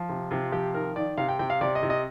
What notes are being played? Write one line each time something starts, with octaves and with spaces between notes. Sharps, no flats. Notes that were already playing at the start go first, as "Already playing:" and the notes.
Already playing: F3
C3
C3 F4
F3 G4
D#3 A#4
D#3 D5
C3 F5
G5
C3 G5
F5
C3 D5
D#5
C3
D#5